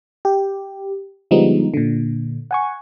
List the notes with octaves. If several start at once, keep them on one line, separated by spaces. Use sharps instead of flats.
G4
D3 F3 G3 G#3 B3 D#4
A#2 D3
F#5 G#5 C#6